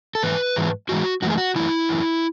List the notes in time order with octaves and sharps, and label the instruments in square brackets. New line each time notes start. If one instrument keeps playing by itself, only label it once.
[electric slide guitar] A4
G#2 E3 B4
G#2 E3 G#3
G#2 E3 G#3 F#4
F#2 E3 A3 F#4
G#4
F#4
F#2 E3 A3 E4
F#2 E3 A3